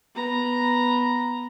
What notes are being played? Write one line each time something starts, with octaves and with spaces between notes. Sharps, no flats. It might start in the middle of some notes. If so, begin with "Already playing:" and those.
B3 A#5